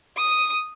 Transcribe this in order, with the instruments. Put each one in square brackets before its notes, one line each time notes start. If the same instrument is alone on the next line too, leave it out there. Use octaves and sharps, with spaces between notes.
[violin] D#6